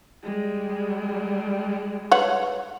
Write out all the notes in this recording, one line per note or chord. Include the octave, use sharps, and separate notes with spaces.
G3 G#3
B4 C#5 F#5